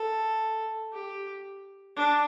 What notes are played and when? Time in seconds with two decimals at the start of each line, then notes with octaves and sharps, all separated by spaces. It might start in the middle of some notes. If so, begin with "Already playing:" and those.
Already playing: A4
0.93 G4
1.96 D4